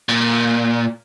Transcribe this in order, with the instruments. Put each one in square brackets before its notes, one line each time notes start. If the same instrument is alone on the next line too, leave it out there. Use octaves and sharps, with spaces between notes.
[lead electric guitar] A#2